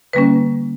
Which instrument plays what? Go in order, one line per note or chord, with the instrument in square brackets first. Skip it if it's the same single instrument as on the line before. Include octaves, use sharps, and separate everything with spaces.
[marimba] D3 G3 A#3 C#4 B4